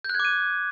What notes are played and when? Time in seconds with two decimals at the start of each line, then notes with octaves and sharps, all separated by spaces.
0.04 G6
0.10 F#6
0.15 G#6
0.20 D6
0.25 D#7